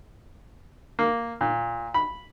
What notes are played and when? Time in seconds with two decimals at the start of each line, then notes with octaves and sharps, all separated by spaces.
0.99 A#3
1.41 A#2
1.94 B5